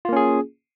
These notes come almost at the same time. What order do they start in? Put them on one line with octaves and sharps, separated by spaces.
F4 A#3 C#4 G#4